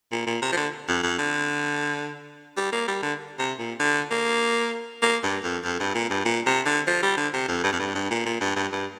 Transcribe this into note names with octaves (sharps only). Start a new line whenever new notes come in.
A#2
A#2
C3
F3
D3
F2
F2
D3
G3
A#3
G3
D3
C3
A#2
D3
A#3
A#3
G2
F2
F2
G2
A#2
G2
A#2
C3
D3
F3
G3
D3
C3
F2
G2
F2
G2
G2
A#2
A#2
G2
G2
G2